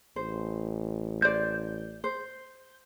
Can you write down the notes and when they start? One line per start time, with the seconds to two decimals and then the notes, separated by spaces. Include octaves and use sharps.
0.16 A1 C5
1.22 C5 D5 G6
2.04 C5